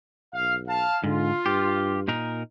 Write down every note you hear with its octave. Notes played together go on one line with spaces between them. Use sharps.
B1 F5
F5 A5
G#2 D3 F4
G2 G4
A#2 D#4 A#4